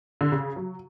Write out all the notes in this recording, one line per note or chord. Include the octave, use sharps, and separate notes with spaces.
D3
C#3
F#3